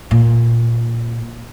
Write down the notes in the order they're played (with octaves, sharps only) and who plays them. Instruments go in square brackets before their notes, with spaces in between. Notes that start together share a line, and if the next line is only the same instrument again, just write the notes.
[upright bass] A#2